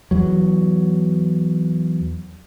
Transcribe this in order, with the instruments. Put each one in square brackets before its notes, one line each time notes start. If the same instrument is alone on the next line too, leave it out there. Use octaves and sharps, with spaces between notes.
[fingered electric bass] E2 F#3